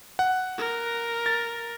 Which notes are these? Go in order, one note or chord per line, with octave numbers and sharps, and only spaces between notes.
F#5
A#4
A6